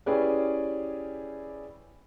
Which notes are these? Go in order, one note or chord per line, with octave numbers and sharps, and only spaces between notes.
C#4 E4 G4 G#4 B4 D5